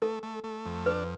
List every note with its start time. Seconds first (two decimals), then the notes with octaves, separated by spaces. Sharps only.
0.02 A3 A4
0.23 A3
0.44 A3
0.66 F2
0.86 D4 B4